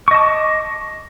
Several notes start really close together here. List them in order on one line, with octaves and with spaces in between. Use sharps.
C#6 D#5 A5 D6